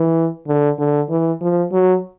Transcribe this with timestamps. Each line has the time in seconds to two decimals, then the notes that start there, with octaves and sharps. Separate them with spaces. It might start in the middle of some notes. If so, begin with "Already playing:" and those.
Already playing: E3
0.48 D3
0.79 D3
1.10 E3
1.41 F3
1.72 F#3